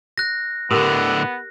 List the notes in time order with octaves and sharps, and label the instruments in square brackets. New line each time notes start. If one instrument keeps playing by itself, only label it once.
[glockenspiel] F#6 A#6
[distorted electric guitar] A2 D3 [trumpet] B3 [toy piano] G4 A#4 D#6